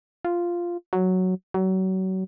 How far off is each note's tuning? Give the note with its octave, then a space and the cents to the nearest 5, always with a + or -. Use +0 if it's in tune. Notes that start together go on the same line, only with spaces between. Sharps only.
F4 -5
F#3 +0
F#3 +30